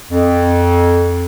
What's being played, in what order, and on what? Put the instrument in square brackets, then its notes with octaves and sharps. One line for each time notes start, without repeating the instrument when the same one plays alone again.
[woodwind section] F2